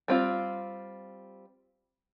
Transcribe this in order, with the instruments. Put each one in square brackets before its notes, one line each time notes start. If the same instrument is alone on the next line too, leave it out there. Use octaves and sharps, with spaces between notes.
[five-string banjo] G3 C4 F4